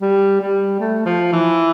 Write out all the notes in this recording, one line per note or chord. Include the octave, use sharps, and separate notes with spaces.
G3
G3
A3
F3
E3